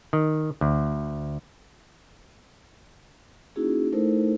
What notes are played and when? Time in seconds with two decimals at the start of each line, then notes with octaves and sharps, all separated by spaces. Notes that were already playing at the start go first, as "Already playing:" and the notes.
0.13 D#3
0.61 D2
3.56 A#3 C#4 D#4 E4 F#4 G#4
3.93 A3 D#4 E4 A4 A#4 C5